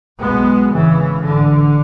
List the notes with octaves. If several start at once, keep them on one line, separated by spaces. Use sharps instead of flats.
B1 B2 G#3 B3
G#1 G#2 C#3 E3
A1 G#2 D3